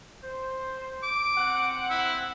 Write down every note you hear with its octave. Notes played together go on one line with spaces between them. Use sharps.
C5
D6
C4 F#5
E4